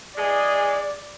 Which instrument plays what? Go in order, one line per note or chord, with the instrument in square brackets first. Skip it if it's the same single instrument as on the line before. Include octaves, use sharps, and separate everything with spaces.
[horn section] E3 G#3 G#4 [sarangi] D5